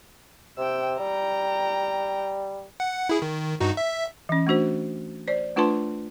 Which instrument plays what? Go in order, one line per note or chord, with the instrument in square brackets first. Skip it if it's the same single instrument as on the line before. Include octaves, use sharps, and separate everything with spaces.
[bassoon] C3 [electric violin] G5 E6
[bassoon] G3 [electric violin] G5 A#5
[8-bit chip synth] F#5
E4 G#4
D#3
G2 D#4 F#4
E5
[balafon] E3 C#4
A3 D4 F#4 C5
C5 D5
A3 D4 F4 B4 A5 C6